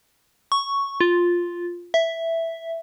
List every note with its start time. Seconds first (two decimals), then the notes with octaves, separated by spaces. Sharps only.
0.52 C#6
1.01 F4
1.94 E5